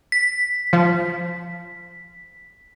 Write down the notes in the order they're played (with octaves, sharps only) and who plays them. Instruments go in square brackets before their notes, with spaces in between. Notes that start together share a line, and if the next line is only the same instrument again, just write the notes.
[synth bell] B6
[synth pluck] F3